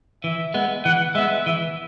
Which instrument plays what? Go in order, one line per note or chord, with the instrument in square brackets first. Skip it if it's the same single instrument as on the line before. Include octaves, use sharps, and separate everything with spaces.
[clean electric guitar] E3 [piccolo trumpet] E5
[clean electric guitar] G#3 B3
[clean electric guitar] E3 [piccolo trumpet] F#5
[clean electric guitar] G#3 B3 [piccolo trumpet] E5
[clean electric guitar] E3 [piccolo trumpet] E5